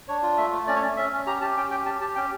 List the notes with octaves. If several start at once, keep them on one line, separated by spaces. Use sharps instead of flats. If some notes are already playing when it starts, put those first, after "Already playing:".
D4 C#5
F4
A3 E5
A3
C#4 D5
C#5
C#4 D5
C#4 E5
C#4
G4 A#5
G4 A5
C#4 G5
G4 G5
G4 A5
G4 A5
C#4 G5